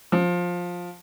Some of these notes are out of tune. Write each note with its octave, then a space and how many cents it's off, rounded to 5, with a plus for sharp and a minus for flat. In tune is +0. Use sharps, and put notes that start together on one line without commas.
F3 +15